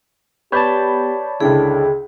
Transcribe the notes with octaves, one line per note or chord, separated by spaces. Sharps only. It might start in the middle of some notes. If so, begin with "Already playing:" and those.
B3 G4 B4 C#5 D5 A5 B5 G6
C#2 D3 D4 E4 G#4 G5